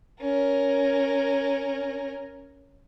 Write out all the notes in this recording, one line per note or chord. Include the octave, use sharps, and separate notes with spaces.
C#4 A#4